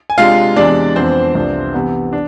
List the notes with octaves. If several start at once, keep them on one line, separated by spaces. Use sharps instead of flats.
G#5
C3 G#3 D4 F4 F5
E2 C3 E3 G#3 D4 D5
F2 E3 B3 C4 D4 C5
C2 C3 F3 B3 D4
C3 E3 B3
D4